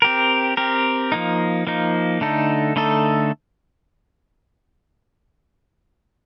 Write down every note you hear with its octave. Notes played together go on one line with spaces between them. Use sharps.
C4 G4 A#4
C4 G4 A#4
F3 A#3 D#4
F3 A#3 D#4
D3 A3 D#4 A4
D3 A3 D#4 A4